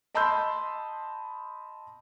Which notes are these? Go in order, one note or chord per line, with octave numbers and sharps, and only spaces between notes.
D#5 A5 B5 C6 E6 G6